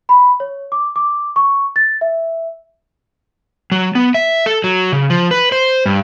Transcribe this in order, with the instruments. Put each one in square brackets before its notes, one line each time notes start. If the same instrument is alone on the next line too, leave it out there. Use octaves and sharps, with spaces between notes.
[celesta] B5
C#5
D6
D6
C#6
A6
E5
[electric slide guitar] F#3
B3
E5
A4
F#3
C#3
F3
B4
C5
G2